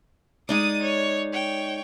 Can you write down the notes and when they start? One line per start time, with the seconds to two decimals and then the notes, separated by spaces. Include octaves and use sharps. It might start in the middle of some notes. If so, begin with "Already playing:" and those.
0.49 G#3 D#4 D5 D#6 D#7
0.83 C#5
1.33 C#5 G5